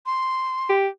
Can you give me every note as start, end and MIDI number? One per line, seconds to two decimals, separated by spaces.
0.06 0.73 84
0.69 0.88 67